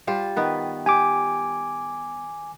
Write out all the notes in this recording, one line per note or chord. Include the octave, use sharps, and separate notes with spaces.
G3 F4 C5
D#3 B3 B4
G4 G#5 D6